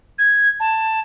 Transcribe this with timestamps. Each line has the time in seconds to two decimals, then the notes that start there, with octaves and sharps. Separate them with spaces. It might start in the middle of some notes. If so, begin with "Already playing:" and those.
0.18 G#6
0.60 A5